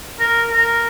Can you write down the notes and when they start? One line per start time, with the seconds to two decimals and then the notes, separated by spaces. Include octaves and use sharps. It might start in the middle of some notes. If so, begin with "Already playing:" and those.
0.20 A#4
0.52 A#4